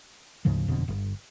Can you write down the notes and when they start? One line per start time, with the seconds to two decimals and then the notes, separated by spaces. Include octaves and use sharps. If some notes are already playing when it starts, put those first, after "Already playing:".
0.45 D2 G#2 C#3 F3
0.68 F#1 F2 B2 D3
0.88 G1